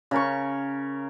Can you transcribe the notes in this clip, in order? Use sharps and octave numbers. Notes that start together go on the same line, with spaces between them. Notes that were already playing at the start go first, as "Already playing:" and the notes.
C#3 A#4 C#6